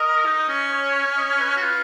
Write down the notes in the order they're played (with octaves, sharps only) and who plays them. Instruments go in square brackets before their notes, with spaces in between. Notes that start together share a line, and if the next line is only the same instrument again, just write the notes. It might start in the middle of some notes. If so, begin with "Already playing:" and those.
Already playing: [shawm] A#4 [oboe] D#5
[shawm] D#4
C#4
[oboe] C#5
D#5
C#5
B4
C#5
[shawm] F#4
[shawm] F4 [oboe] B4